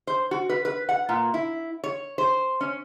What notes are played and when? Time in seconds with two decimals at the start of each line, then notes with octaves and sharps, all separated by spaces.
0.07 C5
0.31 F#4
0.49 B4
0.65 B4
0.89 F#5
1.09 A#2
1.34 E4
1.84 C#5
2.18 C5
2.61 C#4